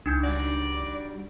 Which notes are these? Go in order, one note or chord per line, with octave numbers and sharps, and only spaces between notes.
C#2 D4 D#4 G6
G3 F#4 D5